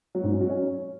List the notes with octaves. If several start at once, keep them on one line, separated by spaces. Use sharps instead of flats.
F#3
G#2
C#4
F#3
C#4